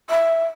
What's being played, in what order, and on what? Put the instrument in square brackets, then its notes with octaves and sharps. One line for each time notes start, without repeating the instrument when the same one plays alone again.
[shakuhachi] E5